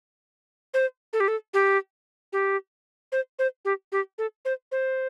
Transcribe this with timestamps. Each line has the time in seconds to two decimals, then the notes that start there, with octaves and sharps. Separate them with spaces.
0.74 C5
1.13 A4
1.20 G4
1.28 A4
1.54 G4
2.33 G4
3.12 C5
3.39 C5
3.65 G4
3.92 G4
4.18 A4
4.45 C5
4.72 C5